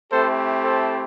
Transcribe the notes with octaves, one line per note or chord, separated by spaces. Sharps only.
A3 C4 E4 G4 A4 C5
A4 C5